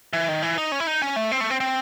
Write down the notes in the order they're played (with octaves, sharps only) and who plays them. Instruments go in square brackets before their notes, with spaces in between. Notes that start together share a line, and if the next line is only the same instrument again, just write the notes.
[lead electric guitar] E3
D#3
E3
D#4
C#4
E4
D#4
C#4
A3
C4
A3
C4
C4